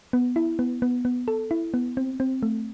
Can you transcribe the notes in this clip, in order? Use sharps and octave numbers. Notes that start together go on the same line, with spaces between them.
B3
E4
B3
B3
B3
A4
E4
B3
C4
C4
A3